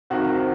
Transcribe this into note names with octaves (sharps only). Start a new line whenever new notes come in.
F2 C3 D#3 F#4